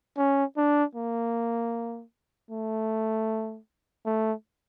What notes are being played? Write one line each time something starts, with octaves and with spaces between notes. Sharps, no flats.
C#4
D4
A#3
A3
A3